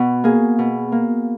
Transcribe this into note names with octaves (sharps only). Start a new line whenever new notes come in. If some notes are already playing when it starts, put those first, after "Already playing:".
Already playing: B2 F#4
A#3 G#4
B2
A#3